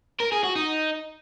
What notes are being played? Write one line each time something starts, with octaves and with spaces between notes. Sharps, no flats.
A#4
G#4
F#4
D#4